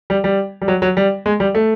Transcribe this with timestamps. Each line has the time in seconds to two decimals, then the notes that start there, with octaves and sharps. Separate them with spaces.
0.10 G3
0.24 G3
0.62 G3
0.68 F#3
0.82 F#3
0.97 G3
1.26 G#3
1.40 G3
1.55 A3